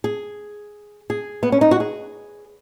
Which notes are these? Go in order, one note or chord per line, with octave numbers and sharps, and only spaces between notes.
G#4
G#4
B3
C#4
D#4
F#4
G#4